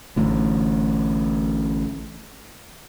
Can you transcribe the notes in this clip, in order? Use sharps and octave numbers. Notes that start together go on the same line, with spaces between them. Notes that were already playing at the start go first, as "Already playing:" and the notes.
A1 A2 D3